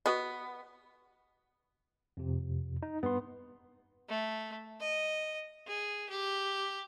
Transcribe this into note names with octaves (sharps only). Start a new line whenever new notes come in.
B3 F#4 B4 D#5
F2 C3
D#4
G2 B3 C6
A3
D#5
G#4
G4